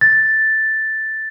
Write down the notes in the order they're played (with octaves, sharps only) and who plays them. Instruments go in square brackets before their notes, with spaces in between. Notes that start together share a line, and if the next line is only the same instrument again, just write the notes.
[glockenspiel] A6